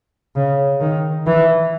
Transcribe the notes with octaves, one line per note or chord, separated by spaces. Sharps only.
C#3
D#3
E3